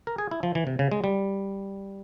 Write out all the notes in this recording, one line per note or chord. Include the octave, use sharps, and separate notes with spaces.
A#4
G#4
E4
F3
E3
C3
C#3
G#3
G3